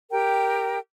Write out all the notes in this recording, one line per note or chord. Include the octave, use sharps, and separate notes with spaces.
G4 A#4 G5